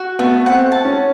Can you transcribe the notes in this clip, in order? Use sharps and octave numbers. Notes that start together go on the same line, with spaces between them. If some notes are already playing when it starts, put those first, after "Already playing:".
Already playing: F#4
A3 B3
C4 F#5
A5
C#4